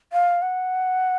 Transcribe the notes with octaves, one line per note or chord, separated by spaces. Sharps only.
F5
F#5